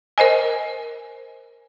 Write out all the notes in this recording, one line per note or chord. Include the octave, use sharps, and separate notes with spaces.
A#4 C5 D#5 G#5